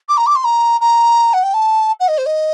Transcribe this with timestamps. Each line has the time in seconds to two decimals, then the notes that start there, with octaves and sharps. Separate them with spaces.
0.09 D6
0.17 A#5
0.26 D6
0.35 C6
0.44 A#5
0.81 A#5
1.33 F#5
1.43 G5
1.54 A5
2.00 F#5
2.08 D#5
2.18 C5
2.26 D#5